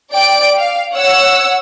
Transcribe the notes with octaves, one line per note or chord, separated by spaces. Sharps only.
D5 G5 D7
F5
C#5 F#5 E6